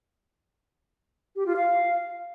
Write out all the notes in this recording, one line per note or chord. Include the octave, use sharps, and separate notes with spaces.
G4
F4
F5